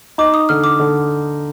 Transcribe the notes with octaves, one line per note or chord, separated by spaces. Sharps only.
D#4 D6
D#6
D3 F6
D6
D3